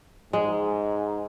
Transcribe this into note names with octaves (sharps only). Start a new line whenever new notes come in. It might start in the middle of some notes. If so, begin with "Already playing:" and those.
G#2 G#3